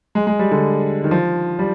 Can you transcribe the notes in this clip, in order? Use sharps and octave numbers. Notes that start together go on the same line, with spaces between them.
G#3
G#3
G3
D3
D#3
F3
G3